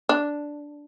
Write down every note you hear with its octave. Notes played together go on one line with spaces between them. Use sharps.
D4